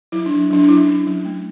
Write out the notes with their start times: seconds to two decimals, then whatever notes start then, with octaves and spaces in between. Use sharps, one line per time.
0.12 F#3 E4
0.26 F#3 D4
0.51 F#3 D4
0.64 D4
0.69 F#3 E4
0.87 C#4
1.07 F#3
1.25 A3